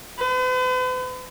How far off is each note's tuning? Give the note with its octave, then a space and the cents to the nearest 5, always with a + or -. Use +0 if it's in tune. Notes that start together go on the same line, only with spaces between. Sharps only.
B4 +45